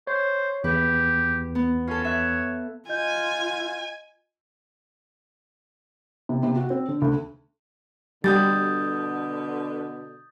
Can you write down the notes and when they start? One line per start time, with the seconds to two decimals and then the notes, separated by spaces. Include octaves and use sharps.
0.07 C5 C#5
0.64 E2 G4 B4
1.55 B3
1.87 C#4 F4 A4
2.04 C#5 E5 F#6
2.89 F4 D#5 G#5 G6
6.29 C3
6.43 C3
6.56 F#4
6.70 C4
6.88 D3
7.02 D2
8.24 B2 D3 G3 D#6 G6 A6